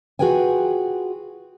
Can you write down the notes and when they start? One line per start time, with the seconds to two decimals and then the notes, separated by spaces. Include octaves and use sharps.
0.19 F4 F#4 G#4 B4 G5 G#5